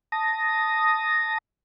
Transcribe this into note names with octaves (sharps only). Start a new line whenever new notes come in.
A5 D#6 A#6